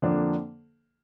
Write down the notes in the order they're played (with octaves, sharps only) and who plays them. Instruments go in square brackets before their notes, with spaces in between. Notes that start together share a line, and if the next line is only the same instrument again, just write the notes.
[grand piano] F2 D3 F3 A#3 D4